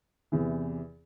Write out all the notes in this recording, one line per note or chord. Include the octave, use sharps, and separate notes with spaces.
E2 C3 E3